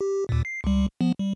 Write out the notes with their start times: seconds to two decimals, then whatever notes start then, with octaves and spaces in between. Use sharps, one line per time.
0.01 G4
0.29 D#2 A#2
0.45 C7
0.64 C#2 G3
1.01 F3 B3
1.19 G3